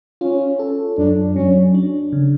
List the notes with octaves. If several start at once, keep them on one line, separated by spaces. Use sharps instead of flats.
C#4 F4
A4
F#2 D4
F#3 C#4
D4
C#3